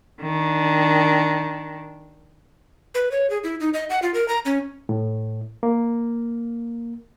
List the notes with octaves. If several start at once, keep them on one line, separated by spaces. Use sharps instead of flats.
D#3 D4
B4
C#5
G#4
E4
D#4
D#5
F#5
F4
A#4
A#5
C#4
A2
A#3